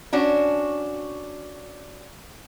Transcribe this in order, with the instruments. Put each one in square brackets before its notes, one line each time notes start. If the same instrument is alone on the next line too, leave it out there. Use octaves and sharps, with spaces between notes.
[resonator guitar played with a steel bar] C#4 D4 F#4